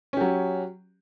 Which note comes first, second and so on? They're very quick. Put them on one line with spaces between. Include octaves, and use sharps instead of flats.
C#4 G4 F#3